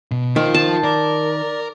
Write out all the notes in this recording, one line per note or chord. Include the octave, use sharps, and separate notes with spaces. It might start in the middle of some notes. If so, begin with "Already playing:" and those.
B2
D#3 F4 C5
A5
A#4 D5